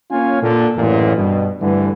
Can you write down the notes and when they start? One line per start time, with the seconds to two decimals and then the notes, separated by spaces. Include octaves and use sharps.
0.11 A#3 C#4 F4 C#5 F5 G#5
0.42 A#2 D3
0.76 A1 F#2 A#2
1.17 G2 B2
1.61 D2 G2 D3 E3